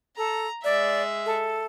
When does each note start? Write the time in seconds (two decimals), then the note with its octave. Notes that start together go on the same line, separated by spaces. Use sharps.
0.17 A4 A#5
0.64 G#3 D5 E5
1.26 A4